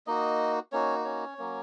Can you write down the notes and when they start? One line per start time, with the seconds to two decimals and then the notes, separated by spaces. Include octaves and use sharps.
0.07 A#3 D#4 F#4 D#5
0.72 A#3 C#4 D#4 F#4 C#5
1.05 C#4 C#5
1.38 F#3 A#3 C#4